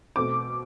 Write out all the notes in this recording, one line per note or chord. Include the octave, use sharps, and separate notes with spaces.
B2 A3 C4 D6